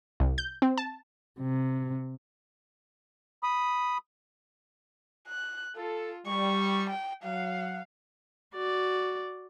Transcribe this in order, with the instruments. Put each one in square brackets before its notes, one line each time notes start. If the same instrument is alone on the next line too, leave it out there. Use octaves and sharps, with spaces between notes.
[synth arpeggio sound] C2
G6
C4
A5
[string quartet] C3
[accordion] B5 D#6
[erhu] F#6
[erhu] F4 [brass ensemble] A4
[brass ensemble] G3 [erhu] C#6
[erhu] G5
[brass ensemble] F#3 F#5 [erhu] F5
[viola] F#4 D5